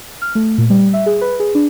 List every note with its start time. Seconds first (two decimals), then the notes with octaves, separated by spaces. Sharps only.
0.22 F6
0.35 A3
0.58 A#2
0.70 G3
0.93 E5
1.06 G#4
1.21 B4
1.40 G#4
1.55 D4